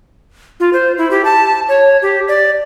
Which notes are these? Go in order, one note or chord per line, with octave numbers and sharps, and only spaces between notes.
F4
C5
E4
G4
A5
C#5
G4
D5